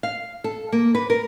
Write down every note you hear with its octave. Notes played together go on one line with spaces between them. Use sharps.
F5
A4
A#3
B4
A#4